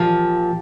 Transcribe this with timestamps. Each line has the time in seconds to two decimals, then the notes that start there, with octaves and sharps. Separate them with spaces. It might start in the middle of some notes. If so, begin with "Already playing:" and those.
Already playing: A#2 F3 G4